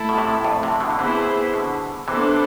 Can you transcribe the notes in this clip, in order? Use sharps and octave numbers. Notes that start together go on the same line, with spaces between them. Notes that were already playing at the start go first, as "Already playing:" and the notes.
Already playing: A3 E4 A4
B2
A2 C3
F2 A2
A2 C3
B2 D3
D3
C3 E3 B3 E4 G#4 C5
B2 D3
C3 E3 B3 D4 A4 C5